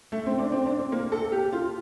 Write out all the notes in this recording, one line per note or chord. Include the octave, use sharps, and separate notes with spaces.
A3
C4
D4
C4
D4
C4
A#3
A4
G4
F4